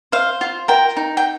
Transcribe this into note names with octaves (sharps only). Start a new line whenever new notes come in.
C5 F5
F4
A#4 G5
D#4
G5